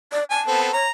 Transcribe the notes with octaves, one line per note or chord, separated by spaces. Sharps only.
D5
G#5 A5
B3 C4 A4
C#5 A#5